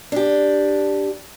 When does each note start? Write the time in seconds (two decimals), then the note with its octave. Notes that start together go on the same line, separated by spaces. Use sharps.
0.12 D4 G4